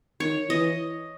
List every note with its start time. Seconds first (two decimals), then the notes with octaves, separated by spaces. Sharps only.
0.20 D#3 C#5
0.50 E3 D#5